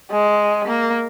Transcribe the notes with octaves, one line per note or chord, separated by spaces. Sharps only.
G#3
A#3